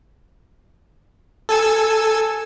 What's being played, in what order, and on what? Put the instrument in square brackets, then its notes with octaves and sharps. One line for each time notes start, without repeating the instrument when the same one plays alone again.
[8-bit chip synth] A4 G#5 E6